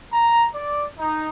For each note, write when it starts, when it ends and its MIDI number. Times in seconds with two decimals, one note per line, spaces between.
0.13 0.46 82
0.55 0.85 74
0.99 1.29 63